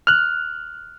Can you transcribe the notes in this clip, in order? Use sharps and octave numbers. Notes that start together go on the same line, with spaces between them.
F6 F#6